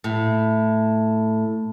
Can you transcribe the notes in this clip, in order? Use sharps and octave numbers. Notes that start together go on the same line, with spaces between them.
A2